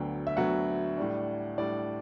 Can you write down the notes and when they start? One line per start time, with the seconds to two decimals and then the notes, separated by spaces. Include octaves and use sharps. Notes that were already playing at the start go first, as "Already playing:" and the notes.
Already playing: D2 D3 F#3 B3 G5
0.27 E5
0.37 D2 D3 F#3 B3 F#5
0.98 A2 G3 D4
1.58 A2 G3 D4 D5